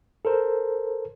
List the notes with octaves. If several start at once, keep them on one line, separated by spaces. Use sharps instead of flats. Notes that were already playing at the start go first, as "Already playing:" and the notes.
A4 A#4 C5